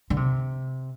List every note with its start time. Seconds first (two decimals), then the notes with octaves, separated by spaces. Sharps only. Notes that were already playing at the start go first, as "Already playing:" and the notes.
0.10 D3
0.17 C3